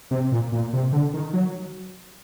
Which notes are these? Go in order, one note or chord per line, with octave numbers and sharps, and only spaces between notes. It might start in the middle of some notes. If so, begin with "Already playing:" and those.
C3
A#2
A#2
C3
D3
D#3
F#3